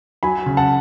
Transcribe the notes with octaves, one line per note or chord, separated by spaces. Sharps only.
F#3 G#5 B5
C#3
F#5 A5